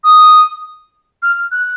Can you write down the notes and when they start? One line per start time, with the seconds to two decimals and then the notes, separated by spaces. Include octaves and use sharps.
0.04 D#6
1.23 F6
1.51 F#6